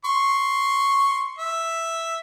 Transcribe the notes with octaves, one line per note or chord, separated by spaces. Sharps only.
C6 C#6
E5